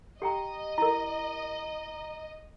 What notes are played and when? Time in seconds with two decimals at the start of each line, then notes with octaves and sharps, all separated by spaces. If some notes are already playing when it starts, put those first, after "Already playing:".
0.22 G4 D#5 G5 A#5
0.78 E4 A#4 A#5